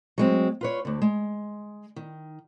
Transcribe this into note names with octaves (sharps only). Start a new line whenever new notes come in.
F#3 G#3 C4
F4 B4 C#5
D2 D3
G#3
D#3